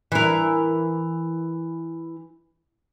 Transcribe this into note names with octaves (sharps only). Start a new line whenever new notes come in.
E3 A#4